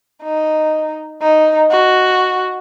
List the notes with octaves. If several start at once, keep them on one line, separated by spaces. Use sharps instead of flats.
D#4
D#4
F#4